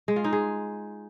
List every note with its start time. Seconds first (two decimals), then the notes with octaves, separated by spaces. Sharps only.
0.08 G#3
0.16 F4
0.24 D#4
0.33 G#4